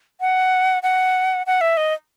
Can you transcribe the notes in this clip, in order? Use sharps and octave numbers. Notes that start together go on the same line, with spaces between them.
F#5
F#5
F#5
E5
D#5